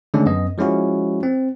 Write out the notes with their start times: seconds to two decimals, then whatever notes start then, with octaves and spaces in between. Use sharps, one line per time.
0.14 D3 D#3 G#3 A3 C#4 D4
0.26 F#2 B3 D#5
0.58 F3 G#3 C#4 E4 F#4
1.23 C4